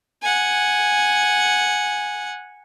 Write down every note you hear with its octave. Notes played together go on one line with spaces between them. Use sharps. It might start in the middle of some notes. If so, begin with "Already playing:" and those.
F#5 G#5